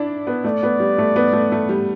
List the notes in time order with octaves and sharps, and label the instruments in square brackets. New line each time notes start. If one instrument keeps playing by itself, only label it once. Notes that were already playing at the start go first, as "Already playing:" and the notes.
Already playing: [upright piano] D4 E4 [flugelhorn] D5
[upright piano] B3
[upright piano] A3 [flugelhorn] D5
[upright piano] B3
G3
A3
B3
A3
A3
G3